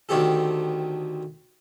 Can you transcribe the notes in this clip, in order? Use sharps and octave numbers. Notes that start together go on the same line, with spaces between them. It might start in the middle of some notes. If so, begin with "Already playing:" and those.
D2 D#3 C4 G4 A4